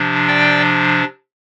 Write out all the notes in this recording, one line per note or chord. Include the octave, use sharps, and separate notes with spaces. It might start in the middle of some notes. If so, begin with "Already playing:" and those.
Already playing: C3 F3 D4
D5 G5